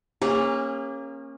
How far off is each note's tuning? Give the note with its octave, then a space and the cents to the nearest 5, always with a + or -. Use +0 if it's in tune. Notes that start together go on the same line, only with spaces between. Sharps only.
A#3 +0 C#4 -20 G#4 -40